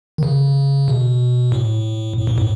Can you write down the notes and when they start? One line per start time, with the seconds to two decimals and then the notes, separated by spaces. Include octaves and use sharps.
0.18 D#3
0.23 C#3
0.88 B2
1.52 A2
2.18 A2
2.27 G#2
2.38 A2